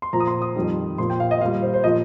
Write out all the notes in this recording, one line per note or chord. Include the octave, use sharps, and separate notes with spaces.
C6
A#2 F3 A#5
D#6
C6
D#6
F2 D#3 G3
A#2 F3 C6
G5
F5
D#5
A#2 G3 F5
C5
C5
A#2 F3 D#5